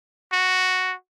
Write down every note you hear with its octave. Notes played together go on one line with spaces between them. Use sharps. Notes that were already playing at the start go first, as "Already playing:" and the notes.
F#4